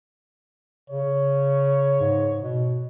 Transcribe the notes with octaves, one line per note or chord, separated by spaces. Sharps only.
C#3 C#5
G#2
B2